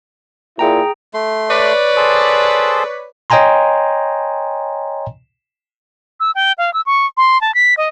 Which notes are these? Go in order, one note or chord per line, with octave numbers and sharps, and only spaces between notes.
A#2 E4 G#4 G5 A#5
A3 C6
B4 C#5 D5
G#4 A4 C5
C#5 D#5 G5 G#5 A#5 C6
E6
G5
F5
E6
C#6
C6
A5
B6
D#5